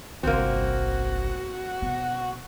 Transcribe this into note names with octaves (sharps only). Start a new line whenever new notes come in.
G1 C2 A#3 C4 F#4
B2 B3